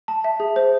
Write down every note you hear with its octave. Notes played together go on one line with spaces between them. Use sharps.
A5
E5
G#4
C5